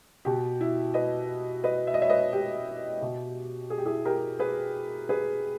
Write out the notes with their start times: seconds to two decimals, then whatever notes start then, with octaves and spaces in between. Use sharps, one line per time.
0.25 B2 G4
0.61 E4
0.94 B4 D#5
1.64 B4 D#5
1.87 E5
1.94 D#5
2.01 C#5 E5
2.09 B4 D#5
2.33 G4
3.02 B2
3.70 G#4
3.78 G4
3.85 E4 G#4
4.05 G4 A#4
4.39 G#4 B4
5.09 G#4 B4